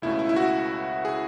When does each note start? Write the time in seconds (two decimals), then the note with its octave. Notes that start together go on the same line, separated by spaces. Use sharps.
0.02 C#2 B2 A3 C#4 E4
0.19 E4
0.29 E4
0.36 F#4
1.05 G#4